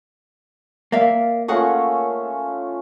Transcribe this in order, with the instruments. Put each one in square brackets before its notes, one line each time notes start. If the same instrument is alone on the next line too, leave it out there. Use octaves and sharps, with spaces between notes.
[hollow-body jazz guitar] A#3 [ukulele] D5 E5 F5
[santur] A3 C#4 F4 [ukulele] G#4 A#4 F#5